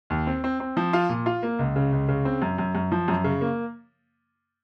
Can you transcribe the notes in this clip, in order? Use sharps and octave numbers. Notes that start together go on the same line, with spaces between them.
D#2
C4
C4
C4
F3
F4
A#2
F4
A#3
C#2
C#3
C#2
C#3
C4
F#2
F#2
F#2
F3
F#2
C#3
A#3